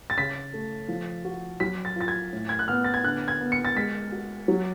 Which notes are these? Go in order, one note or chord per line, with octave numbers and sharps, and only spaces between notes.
A6
C#3 B6
A3
F3
F#4
F#3 B6
A6
F4 A6
G#6
A2
G#6
F#6
B3 F6
A6
G#6
D3 F#6
G#6
B3
C#7
A6
G#3 B6
F#4
F#3